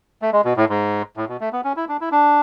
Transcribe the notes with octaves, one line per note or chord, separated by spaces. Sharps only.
A3
G#3
B2
A2
G#2
A2
B2
A3
B3
C#4
E4
D4
E4
D4